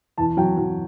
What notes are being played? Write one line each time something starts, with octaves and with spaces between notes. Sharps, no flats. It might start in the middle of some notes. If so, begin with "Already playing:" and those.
E2 A5
F#3 G5
F#3